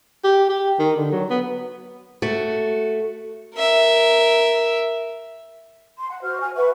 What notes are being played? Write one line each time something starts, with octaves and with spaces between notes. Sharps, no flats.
G4
G4
D#3
D3
F#3
B3
A3 F#4
A#4 E5
C6
F#5
F#4 C5 F6
G#5 F6
B4 E5 F#5 C#6